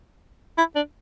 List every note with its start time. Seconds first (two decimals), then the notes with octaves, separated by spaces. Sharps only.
0.58 E4
0.76 D4